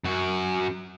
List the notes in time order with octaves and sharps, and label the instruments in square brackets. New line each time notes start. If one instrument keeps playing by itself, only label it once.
[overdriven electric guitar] F#2 F#4